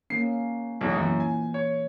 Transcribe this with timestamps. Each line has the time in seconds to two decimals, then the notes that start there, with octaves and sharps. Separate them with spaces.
0.10 A#3 C#4 C7
0.81 B1 E2
0.96 F#2 A#2 E3
1.20 G#5
1.54 C#5